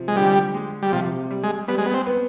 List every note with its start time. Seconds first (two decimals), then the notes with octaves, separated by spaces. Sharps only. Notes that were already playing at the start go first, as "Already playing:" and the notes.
Already playing: C3 F3
0.08 G#3
0.16 D3 G3
0.54 G#3
0.82 G3
0.92 C3 F3
1.31 G3
1.43 G#3
1.68 G3 B3
1.78 G#3
1.86 B3
1.94 C4
2.06 B3